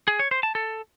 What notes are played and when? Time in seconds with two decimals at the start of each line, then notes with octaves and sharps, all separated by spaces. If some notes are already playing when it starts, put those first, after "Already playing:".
0.08 G#4
0.19 C#5
0.31 C5
0.43 A5
0.55 A4